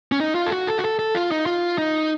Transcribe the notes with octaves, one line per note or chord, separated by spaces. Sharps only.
C#4
D#4
F4
A4
F#4
A4
F#4
A4
A4
F4
D#4
F4
D#4